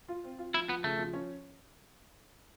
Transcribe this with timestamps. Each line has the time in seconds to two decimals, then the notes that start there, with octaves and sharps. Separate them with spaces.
0.08 F4
0.24 C4
0.39 F4
0.54 F3 E4
0.69 F3 B3
0.84 C#3 A3
0.99 F3
1.13 C#4